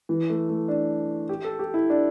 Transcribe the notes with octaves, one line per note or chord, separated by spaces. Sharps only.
E3
A3
A3
D4
G4
A4
G4
E4
D4